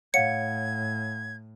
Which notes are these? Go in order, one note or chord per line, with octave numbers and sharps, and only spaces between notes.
A2 C#5 F5 F#5 G#6 C#7